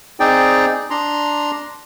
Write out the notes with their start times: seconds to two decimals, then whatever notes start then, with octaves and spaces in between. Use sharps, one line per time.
0.20 C4 D#4 G#4 D5 G5
0.90 D4 A#5 C6